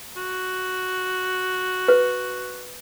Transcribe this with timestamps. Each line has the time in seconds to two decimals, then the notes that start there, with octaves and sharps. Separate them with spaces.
0.17 F#4
1.88 B4